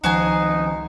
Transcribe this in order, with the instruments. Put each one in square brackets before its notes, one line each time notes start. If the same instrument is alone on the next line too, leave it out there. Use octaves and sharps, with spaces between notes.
[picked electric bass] C#2 D#3 F3 [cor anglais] D#4 [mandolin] F#4 G#4 G#5